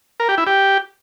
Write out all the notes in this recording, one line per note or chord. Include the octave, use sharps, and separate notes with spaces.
A#4
G4
E4
G4